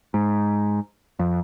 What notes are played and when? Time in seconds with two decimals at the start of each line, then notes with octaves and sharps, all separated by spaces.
0.14 G#2
1.19 F2